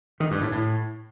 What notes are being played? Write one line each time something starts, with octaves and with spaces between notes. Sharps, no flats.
D#3
G2
A2
A2